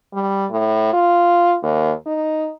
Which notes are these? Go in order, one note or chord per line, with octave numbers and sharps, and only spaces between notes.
G3
A2
F4
D#2
D#4